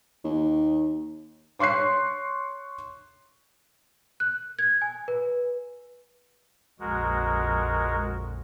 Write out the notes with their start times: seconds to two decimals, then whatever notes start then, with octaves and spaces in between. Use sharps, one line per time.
0.24 D#2
1.59 C#5 C6 C#6 F#6 C7
4.20 F#6
4.59 G#6
4.82 G#5
5.08 B4
6.80 A#1 F2 G#3 F#4 A#4